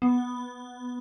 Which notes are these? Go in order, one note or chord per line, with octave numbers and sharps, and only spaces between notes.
B3